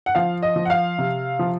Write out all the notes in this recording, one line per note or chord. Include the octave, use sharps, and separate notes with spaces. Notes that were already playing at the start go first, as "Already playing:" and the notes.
F#5
F3 F5
D#5
F3
F#5
F5
C3
F3